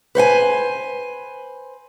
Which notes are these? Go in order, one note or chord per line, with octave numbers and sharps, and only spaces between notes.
B4 C5 F#5 G#5